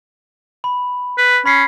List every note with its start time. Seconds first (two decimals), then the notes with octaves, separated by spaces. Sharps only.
0.64 B5
1.18 B4
1.46 C#4 B5 B6 C7